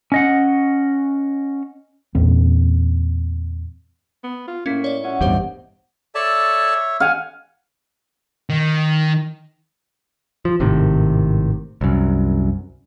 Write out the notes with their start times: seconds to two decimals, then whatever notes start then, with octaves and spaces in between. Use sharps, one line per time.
0.12 C#4 D#5 F#5
2.15 E2 A#2 A#3 C4
4.24 B3
4.48 F4
4.66 A2 A#3 C#4 C#6 B6
4.84 C#5 D5
5.04 C#4 F#4 E5
5.21 A1 E2 G2 B2 G3 A#3 G4 C5
6.15 A4 C#5 D5 E5 A5
7.00 F5 F#5 G#5
8.50 D#3
10.45 F3
10.60 G#1 A2 C3 D#3
11.81 C2 F#2